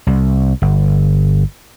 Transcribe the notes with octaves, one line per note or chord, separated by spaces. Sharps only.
C2
G1